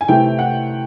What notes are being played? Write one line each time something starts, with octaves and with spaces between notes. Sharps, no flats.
G#5
C3 E3 A3 G5
F#5